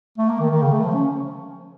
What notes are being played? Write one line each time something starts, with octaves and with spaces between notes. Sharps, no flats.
A3
A#3
D#3
D#3
C#3
A3
F3
C#4